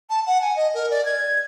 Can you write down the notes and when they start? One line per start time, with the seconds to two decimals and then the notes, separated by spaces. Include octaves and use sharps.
0.10 A5
0.27 F#5
0.41 G#5
0.56 D#5
0.74 A#4
0.90 D5
1.05 G#6